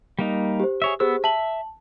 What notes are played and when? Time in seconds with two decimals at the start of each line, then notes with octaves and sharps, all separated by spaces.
0.19 G3 A#3 D#4
0.60 G4 C5
0.82 G#4 C#5 E5
1.00 B3 G4 G#4 C5 E6
1.24 E5 A5 F#7